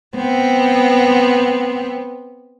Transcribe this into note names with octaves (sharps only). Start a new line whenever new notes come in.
B3 C4